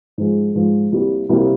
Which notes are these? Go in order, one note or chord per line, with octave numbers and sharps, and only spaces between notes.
G#2 F3 G#3
G#2 F3 G#3
C2 C3 G3 A#3
C2 C3 G3 A#3